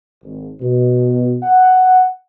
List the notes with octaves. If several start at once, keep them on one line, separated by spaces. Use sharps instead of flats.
G#1
B2
F#5